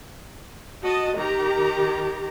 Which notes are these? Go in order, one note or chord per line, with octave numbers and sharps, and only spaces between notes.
F#4 D#5 A5
D#3 G4 A#5